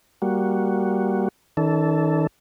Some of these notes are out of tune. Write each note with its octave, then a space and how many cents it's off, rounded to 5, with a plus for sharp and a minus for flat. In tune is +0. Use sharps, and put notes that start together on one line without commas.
G3 +0 A#3 +10 F#4 +0
D#3 +40 D4 -40 A4 +0